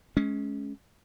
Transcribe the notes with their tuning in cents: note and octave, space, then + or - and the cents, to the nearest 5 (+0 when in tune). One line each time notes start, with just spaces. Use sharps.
G#3 +25 C#4 +0